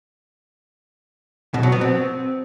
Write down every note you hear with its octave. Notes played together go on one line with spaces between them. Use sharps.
B2
F#3
B3
C4